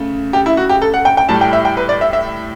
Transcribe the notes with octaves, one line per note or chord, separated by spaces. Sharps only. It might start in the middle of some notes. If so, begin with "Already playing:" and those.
Already playing: C#3 A3
G4
E4
F#4
G4
A4
F#5
G5
G5
A2 G3 A5
G5
E5
G5
B4
D5
E5
E5